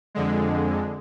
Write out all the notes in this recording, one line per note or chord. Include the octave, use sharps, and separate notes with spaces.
F2 D3 G#3